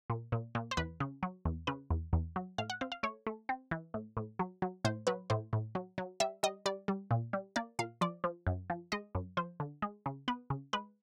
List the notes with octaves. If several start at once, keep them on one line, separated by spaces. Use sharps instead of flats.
A#2
A#2
A#2
C5
E2 B4
C#3
F#3
E2
C#3 B4
E2
E2
F#3
A2 F5
F#5
C4 F5
F5
A3 C#5
A3
C4
E3
A2
A2
F#3
F#3
A2 C5
F#3 B4
A2 C5
A2
F#3
F#3
G3 E5
G3 D#5
G3 D5
G3
A#2
G3
A#3 D5
A#2 F5
F3 D5
F3
F#2
F3
G#3 D#5
F#2
F3 C5
D3
G#3
C#3
B3 B4
C#3
G#3 B4